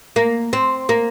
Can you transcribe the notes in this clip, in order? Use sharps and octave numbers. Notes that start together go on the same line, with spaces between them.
A#3
C4
A#3